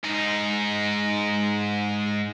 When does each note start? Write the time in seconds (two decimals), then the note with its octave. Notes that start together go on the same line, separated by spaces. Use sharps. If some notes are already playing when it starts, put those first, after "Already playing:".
0.04 G#2 D#4